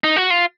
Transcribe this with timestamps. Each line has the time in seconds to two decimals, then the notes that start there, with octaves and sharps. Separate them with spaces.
0.04 D#4
0.16 F#4
0.30 F4